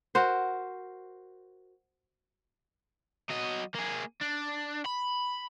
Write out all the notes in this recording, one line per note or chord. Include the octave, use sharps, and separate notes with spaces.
F#4 A#4 C5
F#3 D#5
A#3 G#4
D4
B5